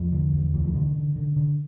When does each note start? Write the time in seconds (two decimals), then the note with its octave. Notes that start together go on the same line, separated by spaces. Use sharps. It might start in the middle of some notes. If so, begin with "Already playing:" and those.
Already playing: E2 F3
0.12 D3
0.33 E2
0.54 D2 E3
0.64 F3
0.74 D3 E3
0.96 D3
1.16 D3
1.36 D3